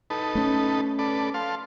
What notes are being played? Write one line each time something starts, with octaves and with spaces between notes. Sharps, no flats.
D#4 A4 B4
A3 C#4
A4 B4 D5
A4 F5 C6